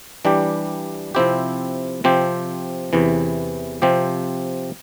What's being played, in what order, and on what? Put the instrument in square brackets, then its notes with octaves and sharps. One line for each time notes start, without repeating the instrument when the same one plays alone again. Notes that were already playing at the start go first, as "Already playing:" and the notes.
[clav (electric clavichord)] E3 G3 D4 G4
C3 F3 C4 E4 G4
C3 F3 C4 G4
E2 C3 E3
C3 F3 C4 G4